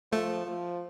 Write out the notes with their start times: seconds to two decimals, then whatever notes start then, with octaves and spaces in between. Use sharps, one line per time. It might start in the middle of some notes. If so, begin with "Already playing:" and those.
0.12 F3 A3
0.46 F3